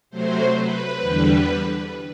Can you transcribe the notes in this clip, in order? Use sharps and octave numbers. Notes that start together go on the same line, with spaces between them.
C3 F#3 A3 C5
B4
E2 D3 G3 D4